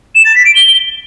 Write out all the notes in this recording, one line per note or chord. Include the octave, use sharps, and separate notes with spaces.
E7
A6
B6
D7
G7